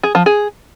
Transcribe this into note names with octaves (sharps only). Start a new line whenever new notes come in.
G#4
F3
G#4